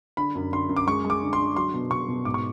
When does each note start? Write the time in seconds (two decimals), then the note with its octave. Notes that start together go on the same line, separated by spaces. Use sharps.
0.17 D3 B5
0.35 F#2
0.52 D3 C6
0.69 F#2
0.76 D6
0.87 G#3 C#6
1.05 G#3
1.10 D6
1.22 D3
1.33 C6
1.39 D3
1.56 F#3 C6
1.74 B2
1.91 B2 C#6
2.08 B2
2.25 G#2 D6
2.34 C#6